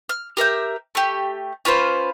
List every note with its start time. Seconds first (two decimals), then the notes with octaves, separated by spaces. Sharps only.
0.09 F6
0.37 G4 A#4 E5 G6
0.95 A3 G4
1.65 C#4 F4 B4 C5